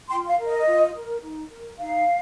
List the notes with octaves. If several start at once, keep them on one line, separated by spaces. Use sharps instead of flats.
F4 G5 C6
F5
A#4
D#5
F4
A#4
D#4
A#4
D#4 F5